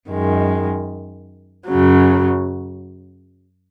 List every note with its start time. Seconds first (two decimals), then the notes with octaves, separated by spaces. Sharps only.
0.10 F#2 D#3 G#3
1.69 F#2 C#3 F#3